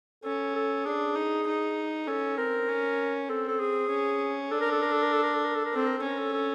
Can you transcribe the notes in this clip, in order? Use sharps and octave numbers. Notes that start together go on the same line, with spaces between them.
C#4 A4
A4
D4 G#4
D#4
D#4
C#4 A4
C4 A#4
C#4
C4 A4
A4
G#4
C#4
D4 A4
A#4
A4
A#4
A4
A#4
A4
A#4
A4
A#4
A4
A#4
C4 A4
A#4
A4
C#4 A#4
A4
A4